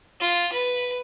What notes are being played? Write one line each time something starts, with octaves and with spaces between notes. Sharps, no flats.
F4
B4